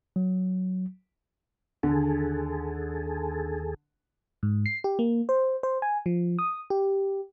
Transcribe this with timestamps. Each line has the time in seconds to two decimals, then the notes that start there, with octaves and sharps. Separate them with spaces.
0.16 F#3
1.83 D#2 D3 G#4 A4
4.43 G#2
4.66 C7
4.84 G4
4.99 A#3
5.29 C5
5.63 C5
5.82 G#5
6.06 F3
6.39 D#6
6.70 G4